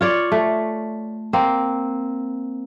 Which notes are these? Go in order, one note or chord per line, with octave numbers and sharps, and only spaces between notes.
F4 C#5 D5
A3
A#3 C4